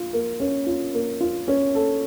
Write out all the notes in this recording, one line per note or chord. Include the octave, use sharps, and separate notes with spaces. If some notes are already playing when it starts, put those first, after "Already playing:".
Already playing: F4
A#3
C#4
F4
A#3
F4
C#4
A4